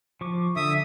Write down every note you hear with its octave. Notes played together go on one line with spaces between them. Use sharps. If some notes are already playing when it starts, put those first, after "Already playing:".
F3 C#6 D6
D3 E5 D#6